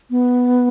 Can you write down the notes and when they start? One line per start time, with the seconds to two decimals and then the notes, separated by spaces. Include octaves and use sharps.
0.10 B3